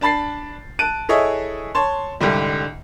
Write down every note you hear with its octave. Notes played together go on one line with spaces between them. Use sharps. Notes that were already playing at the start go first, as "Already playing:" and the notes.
D4 A5 B5 A6 C7
A5 F#6 D7 D#7
E4 G#4 A4 C#5 D#5 E5
C#5 A5 C6
C2 G#2 D3 G3